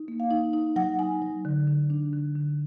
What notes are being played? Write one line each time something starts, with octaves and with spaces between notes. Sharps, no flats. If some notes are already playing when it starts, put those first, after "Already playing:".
Already playing: D#4
A#3
F5
D#4
D#4
F#3 F#5
D#4 G#5
F#3
D3
D3
D4
D3
D3